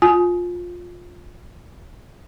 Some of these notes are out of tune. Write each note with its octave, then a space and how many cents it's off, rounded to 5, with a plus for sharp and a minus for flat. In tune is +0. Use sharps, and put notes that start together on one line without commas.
F4 +15 G#5 +30